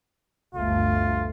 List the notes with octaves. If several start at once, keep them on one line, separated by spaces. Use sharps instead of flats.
G1 D2 A3 F4